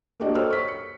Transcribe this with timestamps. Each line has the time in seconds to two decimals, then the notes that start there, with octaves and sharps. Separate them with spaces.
0.20 A#3 D4 F#4 G4 D5 D#5
0.35 A4 A#4 C5 C#5 E6 F6
0.50 C#6 B6
0.68 C#7